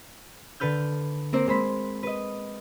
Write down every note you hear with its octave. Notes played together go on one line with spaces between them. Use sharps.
D3 A4 B4 F6 G6
A#3 C4 A#4 C5
G#3 C5 B5 B6
B4 D#5